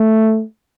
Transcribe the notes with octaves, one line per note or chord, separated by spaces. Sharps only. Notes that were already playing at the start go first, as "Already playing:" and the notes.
Already playing: A3